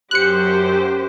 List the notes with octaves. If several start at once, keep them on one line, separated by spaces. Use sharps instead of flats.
F#2 G4 C5 F#6 C#7